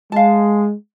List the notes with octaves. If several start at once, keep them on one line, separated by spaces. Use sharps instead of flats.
G#3 F5 A5